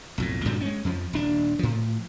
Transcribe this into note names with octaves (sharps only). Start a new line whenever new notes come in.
B1 F2 A2
G2 A#2 D3 F#3
G#3 C#4
F2 F3
D#1 D4
A2 F3